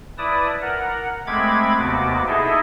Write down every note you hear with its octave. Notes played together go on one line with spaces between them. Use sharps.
E4 B4 D5 A5 D#6
A#4 F#5
G#3 A3 C4 B5 D6 G#6
D#2 C3 B3 F#4 D6
D#4 E4 G#4 A4 D#5 E5